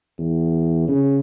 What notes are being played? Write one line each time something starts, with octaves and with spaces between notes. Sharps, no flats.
E2
C#3